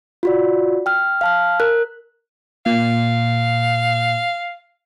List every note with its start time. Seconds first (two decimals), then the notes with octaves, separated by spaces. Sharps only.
0.23 F4 F#4 D5
0.86 G5 F6
1.21 F5 A5 F6
1.60 A#4 F#6
2.66 A#2 F5